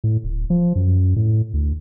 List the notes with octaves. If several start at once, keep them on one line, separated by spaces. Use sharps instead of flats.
A2
D1
F3
F#2
A2
D2